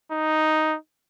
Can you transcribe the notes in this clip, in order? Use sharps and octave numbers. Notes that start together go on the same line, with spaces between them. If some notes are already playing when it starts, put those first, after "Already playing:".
D#4